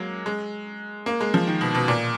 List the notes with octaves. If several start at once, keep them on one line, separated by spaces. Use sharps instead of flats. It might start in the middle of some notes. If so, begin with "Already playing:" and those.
Already playing: F#3 G#3 A#3
G#3
A#3
G#3
F3
D#3
B2
B2
A#2